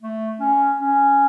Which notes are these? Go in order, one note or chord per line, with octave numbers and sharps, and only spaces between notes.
A3
C#4
C#4